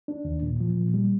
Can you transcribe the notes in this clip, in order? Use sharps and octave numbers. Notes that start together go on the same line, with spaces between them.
D4
D#2
A#2
F3
A#2
G3